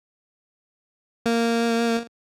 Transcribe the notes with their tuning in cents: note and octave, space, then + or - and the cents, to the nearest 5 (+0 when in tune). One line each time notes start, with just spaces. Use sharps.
A#3 -10